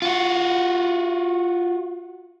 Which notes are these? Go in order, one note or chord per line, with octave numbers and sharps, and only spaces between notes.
F4 F#4